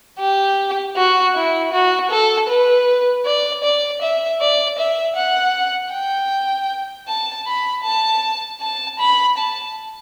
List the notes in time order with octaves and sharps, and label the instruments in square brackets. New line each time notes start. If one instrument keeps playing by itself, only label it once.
[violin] G4
F#4
E4
F#4
A4
B4
D5
D5
E5
D5
E5
F#5
G5
A5
B5
A5
A5
B5
A5